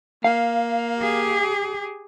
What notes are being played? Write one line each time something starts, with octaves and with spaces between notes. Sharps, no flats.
A#3 F5
G4 G#4